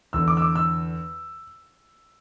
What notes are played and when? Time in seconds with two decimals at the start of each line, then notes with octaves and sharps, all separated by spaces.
0.13 E2 D3 E6
0.28 D6
0.37 E6
0.42 D6
0.56 E6